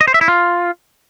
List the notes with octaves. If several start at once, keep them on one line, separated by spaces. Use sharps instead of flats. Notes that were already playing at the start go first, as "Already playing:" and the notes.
D#5
C5
E5
E4
F4